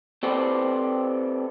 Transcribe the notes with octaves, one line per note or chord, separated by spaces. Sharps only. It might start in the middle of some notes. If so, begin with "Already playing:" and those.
C4 G4 A4 B4 C5 D5